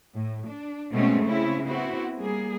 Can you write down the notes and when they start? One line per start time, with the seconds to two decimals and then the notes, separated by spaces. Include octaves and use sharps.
0.14 A2
0.48 D4
0.91 B2 G#3 A3 C4 C#4
1.24 C#3 C4 C#4 E4
1.65 B3 C4 E4 F#4
2.17 G3 A#3 G#4